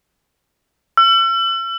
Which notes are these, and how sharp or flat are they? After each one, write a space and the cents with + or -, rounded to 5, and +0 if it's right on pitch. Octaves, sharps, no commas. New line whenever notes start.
E6 +45